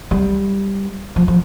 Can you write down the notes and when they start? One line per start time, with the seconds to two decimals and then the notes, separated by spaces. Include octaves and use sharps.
0.11 G3
1.16 F3
1.28 F3